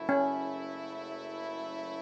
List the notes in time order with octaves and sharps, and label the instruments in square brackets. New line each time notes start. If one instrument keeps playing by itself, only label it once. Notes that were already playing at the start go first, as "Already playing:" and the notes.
Already playing: [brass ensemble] F#1 F#2 C#3 A3 E4
[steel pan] C#4